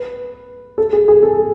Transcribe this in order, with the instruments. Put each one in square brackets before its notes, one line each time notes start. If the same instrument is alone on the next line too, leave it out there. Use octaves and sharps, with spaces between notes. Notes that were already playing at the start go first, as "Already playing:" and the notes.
Already playing: [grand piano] B4
A4
G#4
G#4
A4